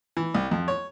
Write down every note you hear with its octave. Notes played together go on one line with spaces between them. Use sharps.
E3
C2
F2
C#5